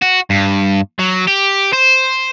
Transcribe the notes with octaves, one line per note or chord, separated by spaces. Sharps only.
F#4
G2
F#3
G4
C5